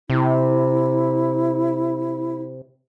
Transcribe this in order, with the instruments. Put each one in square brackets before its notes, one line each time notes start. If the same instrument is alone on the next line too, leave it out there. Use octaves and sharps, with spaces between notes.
[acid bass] C3 [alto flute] E4